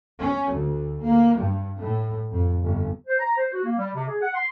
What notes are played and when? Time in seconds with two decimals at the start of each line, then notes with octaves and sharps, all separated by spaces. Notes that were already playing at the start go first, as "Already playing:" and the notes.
0.20 C#4
0.54 D2
1.02 A#3
1.40 G2
1.78 A2
2.31 F2
2.61 G1
3.07 C5
3.19 A#5
3.37 C5
3.52 F#4
3.64 A#3
3.77 G3
3.95 C3
4.08 G#4
4.21 F#5
4.35 C6